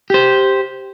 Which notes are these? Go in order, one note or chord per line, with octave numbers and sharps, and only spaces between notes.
G4 C5